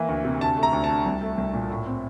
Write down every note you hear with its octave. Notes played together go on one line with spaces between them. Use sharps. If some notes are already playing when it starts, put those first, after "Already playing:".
Already playing: E3 A#3
D2
C3
D2 A5
A3
A#5
D2
A5
D3
C2
A3
C2
A#2
A2
C4